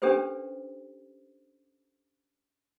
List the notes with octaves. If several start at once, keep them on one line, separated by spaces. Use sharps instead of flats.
C#4 D4 G4 A4 B4 C5